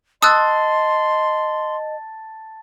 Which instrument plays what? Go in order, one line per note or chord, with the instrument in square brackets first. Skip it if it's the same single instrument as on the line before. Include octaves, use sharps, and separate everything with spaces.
[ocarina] D#5 [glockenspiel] A5 A6 [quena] C6 [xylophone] D#6 E6 F#6